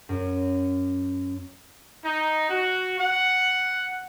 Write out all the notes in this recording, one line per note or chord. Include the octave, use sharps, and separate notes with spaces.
F#2
D#4
F#4
F#5